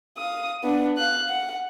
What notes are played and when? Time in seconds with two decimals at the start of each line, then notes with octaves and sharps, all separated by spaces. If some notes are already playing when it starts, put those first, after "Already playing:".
0.17 F5 D#6
0.64 B3 D4
0.97 F5 F#6
1.29 F#5